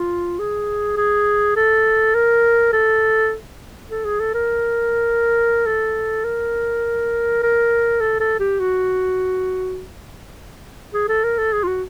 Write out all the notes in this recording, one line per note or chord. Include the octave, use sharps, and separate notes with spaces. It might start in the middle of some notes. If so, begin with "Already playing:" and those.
Already playing: F4
G#4
G#4
A4
A#4
A4
A4
G#4
A4
A#4
A4
A#4
A#4
A4
A4
G4
F#4
G#4
A4
A#4
A4
G#4
F4
F#4